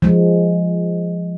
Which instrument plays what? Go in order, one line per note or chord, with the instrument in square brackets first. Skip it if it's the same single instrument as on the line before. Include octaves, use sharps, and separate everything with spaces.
[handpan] F3 G#3